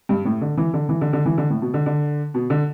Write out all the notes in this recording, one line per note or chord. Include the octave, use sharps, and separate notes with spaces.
G2
A2
D3
E3
D3
E3
D3
D3
E3
D3
A2
B2
D3
D3
B2
D3